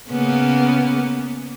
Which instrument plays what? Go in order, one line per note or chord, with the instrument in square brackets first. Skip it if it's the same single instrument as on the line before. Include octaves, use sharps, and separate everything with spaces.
[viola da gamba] C#3 A#3 B3